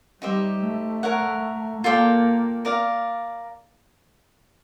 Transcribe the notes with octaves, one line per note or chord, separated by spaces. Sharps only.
G3 D#4 G4 C5 E5
A3
A#4 C#5 F#5
A#3 F4 A4 D5 G5
A#4 D5 F5